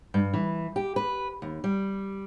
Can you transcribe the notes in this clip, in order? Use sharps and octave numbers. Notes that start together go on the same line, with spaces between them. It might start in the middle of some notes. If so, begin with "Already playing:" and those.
G2
E3
G4
B4
D#2
G3